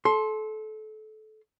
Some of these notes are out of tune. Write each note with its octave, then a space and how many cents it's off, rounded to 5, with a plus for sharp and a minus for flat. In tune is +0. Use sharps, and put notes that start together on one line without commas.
A4 -25 C6 +10